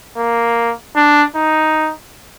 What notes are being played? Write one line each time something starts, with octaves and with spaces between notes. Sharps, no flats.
A#3
D4
D#4